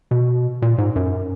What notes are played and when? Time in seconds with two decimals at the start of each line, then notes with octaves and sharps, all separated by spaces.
0.11 B2
0.62 A#2
0.78 G#2
0.96 F#2